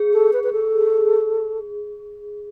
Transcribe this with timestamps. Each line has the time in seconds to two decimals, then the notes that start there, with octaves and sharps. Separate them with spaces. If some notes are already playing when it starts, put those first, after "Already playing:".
Already playing: G#4
0.13 A4
0.33 B4
0.43 B4
0.52 A4